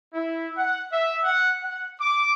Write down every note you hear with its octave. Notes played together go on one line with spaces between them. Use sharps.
E4
F#5
E5
F#5
F#5
D6